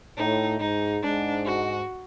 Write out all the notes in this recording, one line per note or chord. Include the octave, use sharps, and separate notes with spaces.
A2 D#4
G#2 D#4
G#2 D4
F#4